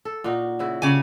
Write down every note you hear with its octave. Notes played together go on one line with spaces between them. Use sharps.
A4
A#2 D#4 F#4
C#3 E4 F#4
C#3 G4 G#5